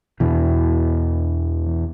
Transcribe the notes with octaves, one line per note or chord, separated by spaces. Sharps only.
E2 B2 E3